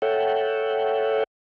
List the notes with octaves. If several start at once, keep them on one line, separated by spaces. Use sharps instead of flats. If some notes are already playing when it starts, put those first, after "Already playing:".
A4 C#5 E5 F#5 G5